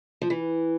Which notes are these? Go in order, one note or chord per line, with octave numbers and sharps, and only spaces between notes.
F3
E3